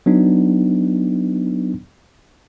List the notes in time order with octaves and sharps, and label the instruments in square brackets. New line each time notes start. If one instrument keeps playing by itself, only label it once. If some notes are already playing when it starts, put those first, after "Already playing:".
[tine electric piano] F#3 B3 D4 D#4